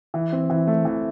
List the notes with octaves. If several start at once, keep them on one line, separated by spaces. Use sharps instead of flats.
E3
C4
E3
A3
E3